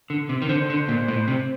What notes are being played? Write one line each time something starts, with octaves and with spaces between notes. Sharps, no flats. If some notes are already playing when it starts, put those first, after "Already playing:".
D3
C3
D#3
D3 C5
D3
A#2
A2
C3